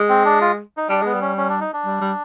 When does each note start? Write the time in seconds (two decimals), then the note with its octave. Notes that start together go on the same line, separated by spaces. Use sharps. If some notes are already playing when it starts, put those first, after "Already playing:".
Already playing: G#3
0.09 C4
0.25 D4
0.41 F4
0.77 D#4
0.89 G3 D4
1.02 G#3 B3
1.14 G3
1.21 C#4
1.37 C#4
1.49 D4
1.61 D#4
1.73 D4
1.85 G3
2.01 G3